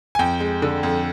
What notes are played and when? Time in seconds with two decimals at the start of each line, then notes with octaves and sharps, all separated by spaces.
0.15 G#5
0.19 F2 G5
0.40 G#3
0.62 D3
0.83 F2